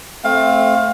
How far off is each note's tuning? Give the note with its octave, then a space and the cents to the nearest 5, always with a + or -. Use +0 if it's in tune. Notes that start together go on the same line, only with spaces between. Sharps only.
A3 +0 C4 +5 F5 +20